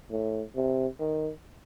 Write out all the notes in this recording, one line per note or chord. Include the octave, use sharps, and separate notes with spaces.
A2
C3
D#3